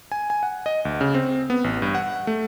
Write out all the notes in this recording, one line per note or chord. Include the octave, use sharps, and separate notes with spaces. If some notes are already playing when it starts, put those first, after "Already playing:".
G#5
G#5
F#5
D#5
D2
C#3
C4
B3
A1
G2
F#5
A3